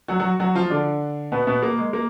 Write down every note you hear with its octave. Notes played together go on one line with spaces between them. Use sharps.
F#3 F#4
F#3 F#4
F#3 F#4
F3 F4
D3 D4
B2 B3
B2 B3
A#3
G#3
A#3